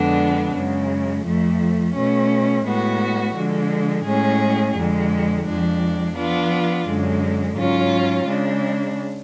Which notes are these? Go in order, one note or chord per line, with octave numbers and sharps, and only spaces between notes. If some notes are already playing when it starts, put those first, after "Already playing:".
Already playing: F2 D3 G#3 B3 D4
F#2 C#3 G#3
F2 F3 A3
B2 A3 C#4
A2 G#3 B3 F#4
D3 F3 G#3
A2 G#3 C#4 G#4
F2 D3 G#3
F2 F3 G#3 D4
F3 B3 D4 F4
F#2 D3 G#3
G#2 F#3 C#4 F4
C#3 G#3 D4